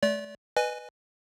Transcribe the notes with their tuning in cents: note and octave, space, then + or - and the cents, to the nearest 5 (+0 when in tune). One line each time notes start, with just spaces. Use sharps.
A3 -40 D5 -30
B4 +0 D#5 -30 G#5 +0